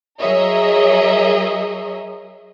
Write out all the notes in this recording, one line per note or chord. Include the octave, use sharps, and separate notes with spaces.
F#3 G#4 A#4 C#5 D#5 E5